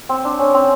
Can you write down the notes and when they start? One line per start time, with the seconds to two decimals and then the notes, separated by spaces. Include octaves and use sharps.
0.09 C4
0.25 D4
0.39 C#4
0.54 C4